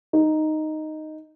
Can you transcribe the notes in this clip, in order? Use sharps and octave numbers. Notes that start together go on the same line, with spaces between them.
D#4